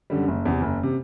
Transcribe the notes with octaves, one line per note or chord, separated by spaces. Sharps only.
F#2 D3 G3
F#1
E2 C3
F#1
C3